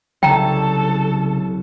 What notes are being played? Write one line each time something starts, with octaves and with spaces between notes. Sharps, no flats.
C2 C#3 F#3 A4 G5 A5 A#5